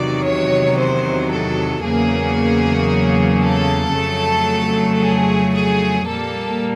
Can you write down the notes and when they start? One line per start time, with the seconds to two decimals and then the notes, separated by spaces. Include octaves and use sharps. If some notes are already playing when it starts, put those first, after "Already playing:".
Already playing: E2 C3 D#3 F#3 D5
0.24 C#5
0.77 C5
1.30 A4
1.83 E2 C#3 F#3 A#3 G#4
3.43 A4
3.96 F2 C#3 F#3 A3
5.02 G#4
5.55 G#4
6.08 A#2 G3 A#3 A4